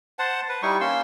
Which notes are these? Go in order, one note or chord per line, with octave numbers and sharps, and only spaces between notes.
C5 F#5 A5
B4
G3 D#4 E4 C#6
A#3 C#4 C6 E6